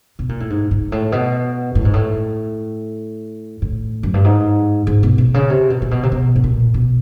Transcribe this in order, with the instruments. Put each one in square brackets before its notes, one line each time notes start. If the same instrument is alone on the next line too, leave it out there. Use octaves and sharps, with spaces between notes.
[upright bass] B2
A#2
A2
G#2
G#2
A2
B2
A2
G#2
A2
A2
F#2
G2
G#2
G#2
B2
B2
C#3
C3
B2
A#2
B2
C3
B2
A2
A#2
B2